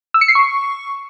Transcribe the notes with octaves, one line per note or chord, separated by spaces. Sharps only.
E6
C#7
C7
C#6